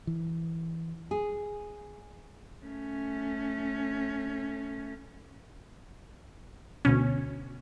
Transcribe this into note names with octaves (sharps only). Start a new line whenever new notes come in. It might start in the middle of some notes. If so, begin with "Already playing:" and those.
E3
G#4
A3 C#4
D2 B2 C#4